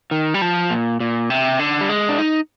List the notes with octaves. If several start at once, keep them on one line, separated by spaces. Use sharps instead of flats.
D#3
G3
F3
A#2
A#2
C3
D3
G3
G#3
D4
D#4